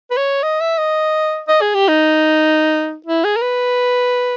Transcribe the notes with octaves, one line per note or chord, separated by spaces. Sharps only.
B4
C#5
D#5
E5
D#5
D#5
G#4
G4
D#4
E4
G#4
A#4
B4